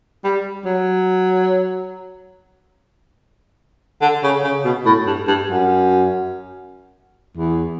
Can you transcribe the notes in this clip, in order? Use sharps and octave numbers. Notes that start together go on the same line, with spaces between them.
G3
F#3
D3
C#3
C#3
B2
A2
G2
G2
F#2
E2